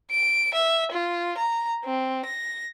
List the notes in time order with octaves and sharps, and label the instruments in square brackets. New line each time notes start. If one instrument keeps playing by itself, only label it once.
[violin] D7
E5
F4
A#5
C4
A#6